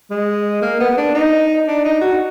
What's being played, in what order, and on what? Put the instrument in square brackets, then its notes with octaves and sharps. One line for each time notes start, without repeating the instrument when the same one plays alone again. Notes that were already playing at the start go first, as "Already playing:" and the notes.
[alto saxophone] G#3
A#3
B3
D4
D#4
D4
D#4
F#4